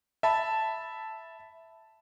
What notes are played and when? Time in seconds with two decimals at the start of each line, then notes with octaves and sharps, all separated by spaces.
0.23 E5 A5 B5